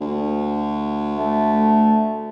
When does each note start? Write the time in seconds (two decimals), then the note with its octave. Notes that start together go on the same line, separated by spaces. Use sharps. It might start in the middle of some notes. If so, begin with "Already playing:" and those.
0.01 D2
1.15 A3